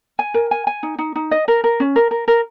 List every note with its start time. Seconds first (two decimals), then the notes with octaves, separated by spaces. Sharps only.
0.19 G#5
0.34 A#4
0.51 G#5
0.67 G#5
0.83 D#4
0.99 D#4
1.16 D#4
1.31 D#5
1.48 A#4
1.64 A#4
1.80 C#4
1.96 A#4
2.11 A#4
2.28 A#4